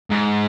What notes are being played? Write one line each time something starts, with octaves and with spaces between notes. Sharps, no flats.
G#2